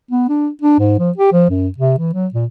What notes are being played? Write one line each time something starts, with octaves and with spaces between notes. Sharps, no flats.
B3
D4
D4
G#2
F3
G4
F3
F#2
C3
E3
F#3
A#2